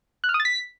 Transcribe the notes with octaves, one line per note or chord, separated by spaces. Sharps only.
F#6
F6
D#6
A6
B6